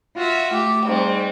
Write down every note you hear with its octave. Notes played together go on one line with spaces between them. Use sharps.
F4 F#4 E5
A3 G4
G#2 G3 C4